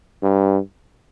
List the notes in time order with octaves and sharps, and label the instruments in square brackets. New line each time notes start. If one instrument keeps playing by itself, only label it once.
[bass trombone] G2